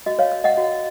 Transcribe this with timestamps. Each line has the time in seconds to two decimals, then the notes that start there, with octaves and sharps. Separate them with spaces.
0.06 F#4 D#5
0.19 C#5 F5
0.32 C#5
0.44 D#5 F#5
0.57 F#4